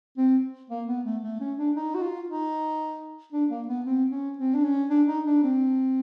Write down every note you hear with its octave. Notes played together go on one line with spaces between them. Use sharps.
C4
A#3
B3
A3
A3
C#4
D4
D#4
F#4
F4
D#4
D4
A#3
B3
C4
C#4
C4
D4
C#4
D4
D#4
D4
C4